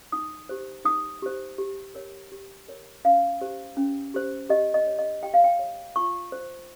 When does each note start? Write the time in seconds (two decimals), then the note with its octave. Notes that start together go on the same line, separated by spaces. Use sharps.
0.12 D#4 D#6
0.49 G4 C5
0.85 D#4 D#6
1.22 G4 C5
1.58 G4
1.95 A#4 C#5
2.32 G4
2.68 A#4 C#5
3.05 C#4 F5
3.41 G4 C5
3.77 C#4
4.14 G4 C5
4.50 G4 D#5
4.74 D#5
4.87 C#5
4.99 D#5
5.23 G4 G5
5.34 F5
5.44 G5
5.59 C#5
5.96 F4 C#6
6.32 C5